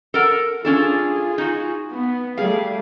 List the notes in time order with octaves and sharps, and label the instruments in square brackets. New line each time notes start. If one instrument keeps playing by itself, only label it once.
[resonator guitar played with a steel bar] A4 A#4 F#5
[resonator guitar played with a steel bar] C#4 D4 A4 [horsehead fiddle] F4 G#4
[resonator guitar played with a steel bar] D#4 F#4
[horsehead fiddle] B3
[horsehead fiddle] G3 A3 [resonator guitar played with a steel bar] G#4 F5